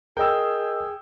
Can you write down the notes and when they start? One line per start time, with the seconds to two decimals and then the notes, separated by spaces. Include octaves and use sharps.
0.17 G#4 A#4 D#5 G5 E6